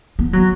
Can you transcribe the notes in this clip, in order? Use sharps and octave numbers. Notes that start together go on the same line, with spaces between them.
B3
F#3